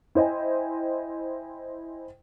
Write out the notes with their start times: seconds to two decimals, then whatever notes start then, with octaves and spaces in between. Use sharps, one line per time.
0.15 E4 C5 D#5 G5 G#5